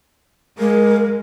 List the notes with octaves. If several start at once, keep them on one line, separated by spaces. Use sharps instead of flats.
G#3 A#4